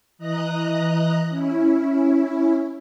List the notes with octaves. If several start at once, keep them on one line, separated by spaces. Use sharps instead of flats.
E3 D#5 A#5 D#6 F#6
C#4 E4